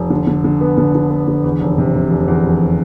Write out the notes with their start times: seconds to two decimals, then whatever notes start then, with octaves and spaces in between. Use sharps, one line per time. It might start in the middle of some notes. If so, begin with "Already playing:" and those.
Already playing: F1
0.10 D3
0.27 D3
0.44 D3
0.61 B3
0.78 D3
0.95 D3
1.10 B3
1.27 D3
1.43 E2
1.61 F1
1.78 C3
1.94 C3
2.10 F1
2.28 E2
2.44 F1